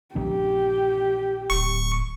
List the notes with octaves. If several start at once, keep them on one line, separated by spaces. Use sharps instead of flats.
A#1 D#3 D4 G4
D1 C#6